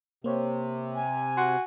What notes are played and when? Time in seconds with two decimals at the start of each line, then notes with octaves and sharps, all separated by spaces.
0.24 C3 A#3 C5 C#5
0.95 G#5
1.37 F#4 C6